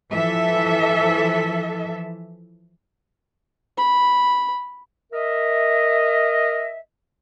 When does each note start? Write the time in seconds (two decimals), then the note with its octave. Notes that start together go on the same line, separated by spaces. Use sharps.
0.11 E3 F3 A4 E5
3.78 B5
5.13 A#4 D#5 E5